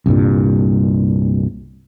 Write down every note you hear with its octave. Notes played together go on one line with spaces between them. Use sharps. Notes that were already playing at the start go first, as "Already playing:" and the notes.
C2 G2 A#2